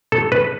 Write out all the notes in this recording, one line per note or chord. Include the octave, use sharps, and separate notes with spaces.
A4
B4